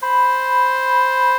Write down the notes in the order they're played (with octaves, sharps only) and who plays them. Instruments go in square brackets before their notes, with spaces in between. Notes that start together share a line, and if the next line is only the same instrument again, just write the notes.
[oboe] C5 [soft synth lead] B5